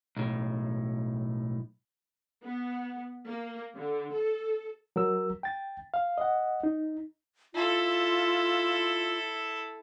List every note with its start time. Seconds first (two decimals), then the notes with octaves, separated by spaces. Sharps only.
0.16 B1 A2
2.43 B3
3.26 A#3
3.75 D3
4.13 A4
4.96 F#3 A#4 E6
5.43 G5 A6
5.94 F5
6.18 D#5 F#5
6.64 D#4
7.54 E4 F4 A4